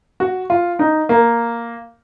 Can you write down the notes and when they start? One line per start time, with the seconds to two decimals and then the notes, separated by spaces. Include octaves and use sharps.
0.20 F#4
0.50 F4
0.79 D#4
1.09 A#3